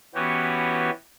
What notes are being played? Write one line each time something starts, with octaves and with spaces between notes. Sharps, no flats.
E3 B3 C#4 F#4 G4